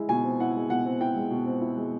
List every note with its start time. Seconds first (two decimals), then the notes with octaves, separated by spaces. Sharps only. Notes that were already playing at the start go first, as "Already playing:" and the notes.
Already playing: G#3 E4
0.09 B2 G#5
0.24 C4
0.40 E4 F#5
0.55 G#3
0.70 B2 F#5
0.86 C4
1.01 E4 G5
1.16 G#3
1.31 B2
1.46 C4
1.61 E4
1.77 G#3